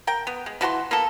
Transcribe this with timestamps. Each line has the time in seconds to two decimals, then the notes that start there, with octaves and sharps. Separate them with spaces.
0.07 A#4 G5
0.27 B3
0.46 G#3
0.61 E3 F#4 A5 C6
0.91 A#3 B3 A4